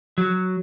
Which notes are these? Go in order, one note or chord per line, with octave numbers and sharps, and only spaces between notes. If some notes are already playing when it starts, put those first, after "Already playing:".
F#3